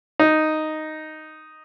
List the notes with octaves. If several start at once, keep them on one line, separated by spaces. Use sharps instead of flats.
D#4